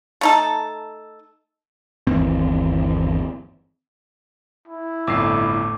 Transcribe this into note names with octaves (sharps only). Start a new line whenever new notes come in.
A3 D#4 A4
G1 D#2 E3 C4
E4
G1 F2 A2 D5 D6 E6 C7